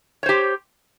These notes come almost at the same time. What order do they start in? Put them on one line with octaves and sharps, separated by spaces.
C#5 C5 G4